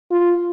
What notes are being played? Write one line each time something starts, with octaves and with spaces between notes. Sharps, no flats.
F4